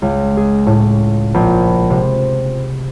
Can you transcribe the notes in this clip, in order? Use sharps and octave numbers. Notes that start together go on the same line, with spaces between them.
C#2
G#4
A2
A#1
C3